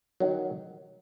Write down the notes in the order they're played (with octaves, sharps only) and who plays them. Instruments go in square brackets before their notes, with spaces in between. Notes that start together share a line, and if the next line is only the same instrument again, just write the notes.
[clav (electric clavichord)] D#3 F#3